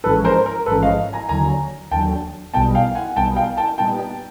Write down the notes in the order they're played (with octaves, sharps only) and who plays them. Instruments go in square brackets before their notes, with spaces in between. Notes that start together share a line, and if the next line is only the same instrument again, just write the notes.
[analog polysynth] A1 G#2 F3 G#3 C#4 [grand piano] A4 B4
[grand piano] A#4 C5
A#4
[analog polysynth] A1 G#2 F3 G#3 C#4 [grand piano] A4 B4
[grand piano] D#5 F5
G#5 A#5
[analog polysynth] D#2 D3 F#3 [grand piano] G#5 A#5
[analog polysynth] D#2 D3 F#3 [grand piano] G5 A5
[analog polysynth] B1 B2 G3 B3 D#4 [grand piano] G5 A5
[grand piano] F5 G5
F#5 G#5
[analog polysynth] B1 B2 G3 B3 D#4 [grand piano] G5 A5
[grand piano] F5 G5
G5 A5
[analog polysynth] A#2 G3 B3 D#4 [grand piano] G5 A5